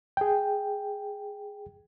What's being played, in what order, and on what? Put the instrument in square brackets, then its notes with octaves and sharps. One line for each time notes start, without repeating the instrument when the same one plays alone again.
[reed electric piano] G#4 G5